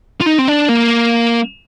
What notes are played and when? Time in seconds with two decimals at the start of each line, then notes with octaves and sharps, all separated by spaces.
0.21 F4
0.27 D#4
0.39 C4
0.48 D4
0.69 A#3